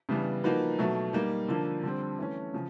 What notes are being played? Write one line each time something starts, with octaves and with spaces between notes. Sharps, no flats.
C#3 E3 G3 B3 D4
F3 A#3 D#4 F#4 B4
B2 F#3 A3
G3 A#3 D#4
D3 F3 A#3 D4
D3 G3 C4
E3 A3 C#4
C#3 F3